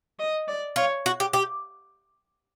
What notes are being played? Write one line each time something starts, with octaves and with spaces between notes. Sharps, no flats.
D#5
D5
F4 C#5
F#4
G4
G4